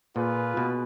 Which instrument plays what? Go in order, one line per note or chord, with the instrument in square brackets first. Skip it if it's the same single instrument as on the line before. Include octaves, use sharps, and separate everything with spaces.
[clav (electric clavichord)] A#2 [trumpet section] F4 G#4 B4
[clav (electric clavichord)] B2